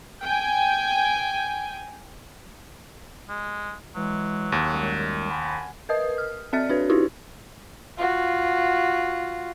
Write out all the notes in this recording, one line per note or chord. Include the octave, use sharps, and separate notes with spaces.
G5 G#5
G#3
E3 F#3 G#3
D#2
F#2 G3 G#3
F#5 G#5 B5
A#4 B4 D#5 D#6
F6
C4 A4 D5 E5 F6 A6
D4 F#4 B4 C#5
D#4 E4 F#4 G4 B4
F4 F#4